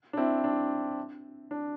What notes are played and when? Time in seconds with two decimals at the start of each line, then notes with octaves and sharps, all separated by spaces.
0.13 D4
0.17 C4 E4
0.44 D4
1.51 D4